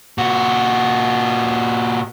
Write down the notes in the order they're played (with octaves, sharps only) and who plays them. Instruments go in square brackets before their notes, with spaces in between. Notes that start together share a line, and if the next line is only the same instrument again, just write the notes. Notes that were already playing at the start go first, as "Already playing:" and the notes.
[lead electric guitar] A#2 F#4